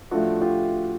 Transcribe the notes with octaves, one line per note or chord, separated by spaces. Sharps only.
A2 F3 A3 D4 F4 F#4
F4 G4